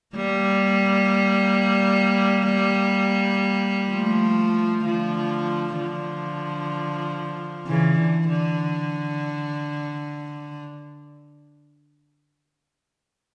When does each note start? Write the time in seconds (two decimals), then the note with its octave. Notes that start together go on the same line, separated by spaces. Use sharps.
0.16 G3 A#3
3.91 F3 A3
4.85 D3 F3
5.79 D3 F3
7.67 C#3 E3
7.99 D3
8.29 D3